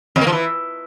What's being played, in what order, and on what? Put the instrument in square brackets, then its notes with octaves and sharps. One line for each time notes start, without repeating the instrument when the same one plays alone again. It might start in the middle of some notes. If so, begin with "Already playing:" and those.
[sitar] F2
A#3
F3
E3